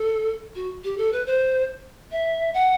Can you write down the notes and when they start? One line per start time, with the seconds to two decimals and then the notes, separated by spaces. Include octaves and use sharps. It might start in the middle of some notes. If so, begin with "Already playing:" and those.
Already playing: A4
0.55 F#4
0.84 G4
0.97 A4
1.12 B4
1.26 C5
2.11 E5
2.54 F#5